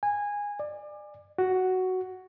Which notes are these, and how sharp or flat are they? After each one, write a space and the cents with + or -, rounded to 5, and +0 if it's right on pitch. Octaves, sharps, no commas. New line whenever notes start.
G#5 -15
D5 +30
F#4 +5